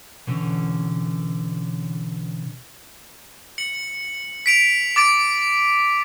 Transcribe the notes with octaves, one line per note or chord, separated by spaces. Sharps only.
B2 D3 E3 C#4
C#7 F#7
B6 D7 F7
D6 A6 D7